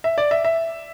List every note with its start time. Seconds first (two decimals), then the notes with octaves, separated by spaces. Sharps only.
0.04 E5
0.18 D5
0.31 E5
0.45 E5